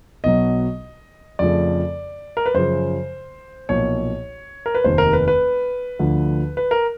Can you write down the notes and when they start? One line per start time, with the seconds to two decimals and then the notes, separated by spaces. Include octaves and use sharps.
0.24 B1 B2 F#3 D#5
1.39 F2 C#3 F3 A3 D5
2.37 A#4
2.46 B4
2.54 F#2 C#3 F3 C5
3.69 B1 A#2 F3 A#3 C#5
4.66 A#4
4.75 B4
4.84 F1 D#2 D#3 C5
4.98 A#4
5.13 B4
5.28 B4
5.99 D2 D3 F3
6.57 B4
6.71 A#4